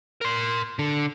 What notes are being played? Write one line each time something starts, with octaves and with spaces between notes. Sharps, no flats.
A#4 C6
D3